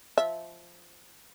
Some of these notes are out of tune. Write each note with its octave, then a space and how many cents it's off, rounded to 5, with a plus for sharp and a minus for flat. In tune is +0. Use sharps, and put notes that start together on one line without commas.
F3 -5 E5 -15